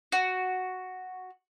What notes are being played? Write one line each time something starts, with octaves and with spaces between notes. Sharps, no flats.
F#4